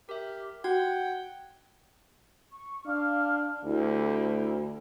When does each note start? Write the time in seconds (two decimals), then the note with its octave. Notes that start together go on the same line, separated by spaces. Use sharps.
0.09 G4 A#4 E5
0.64 F#4 F#5 G5 G#6
2.52 C#6
2.86 D4 F5 D6 F6
3.64 D2 E4 G4